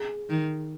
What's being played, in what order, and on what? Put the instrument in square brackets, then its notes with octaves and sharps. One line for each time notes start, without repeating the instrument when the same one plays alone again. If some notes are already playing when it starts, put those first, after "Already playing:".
Already playing: [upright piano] G#4
[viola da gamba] D#3